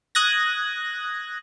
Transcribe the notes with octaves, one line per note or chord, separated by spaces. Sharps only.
D#6 F#6 G#6 A#6